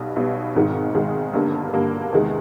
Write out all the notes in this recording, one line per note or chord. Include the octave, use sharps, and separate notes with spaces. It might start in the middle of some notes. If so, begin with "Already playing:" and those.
Already playing: B1 B2 G3 B3
B1 B2 G3 B3
G#1 G#2 D#3 G#3
G#1 G#2 D#3 G#3
G1 G2 D3 G3 A#3
G1 G2 D3 G3 A#3
E2 C3 D#3 G#3